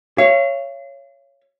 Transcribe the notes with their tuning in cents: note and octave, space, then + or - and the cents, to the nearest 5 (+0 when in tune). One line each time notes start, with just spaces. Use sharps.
C#5 +0 F5 -40